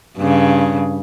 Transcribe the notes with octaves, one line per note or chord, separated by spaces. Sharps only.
G2 C#3